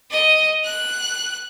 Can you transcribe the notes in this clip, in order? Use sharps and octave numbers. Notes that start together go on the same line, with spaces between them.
D#5
F#6